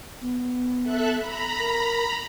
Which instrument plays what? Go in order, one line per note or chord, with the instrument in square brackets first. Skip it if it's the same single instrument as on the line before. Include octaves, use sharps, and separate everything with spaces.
[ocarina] B3
[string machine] A4 E5 F#6
A#5 B5
[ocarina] A#4